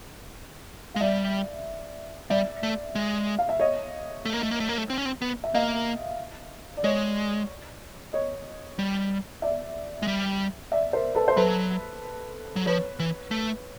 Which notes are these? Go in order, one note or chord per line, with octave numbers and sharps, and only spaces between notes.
G#3 F5
G3 D5 E5
G3 D5 E5
A3
G#3
F5
E5
C#5 D#5
A3
A#3
A3
A#3
A3
A#3
A3
C4
C#4
C4
B3
E5
A#3 D#5 F5
D5
G#3 C#5 D#5
C#5 D#5
G3
D5 E5
G#3
G3
D5 E5
A#4 C5
A4 B4
C5
F#3 A4 B4
F#3
F3 B4 C#5
E3
A3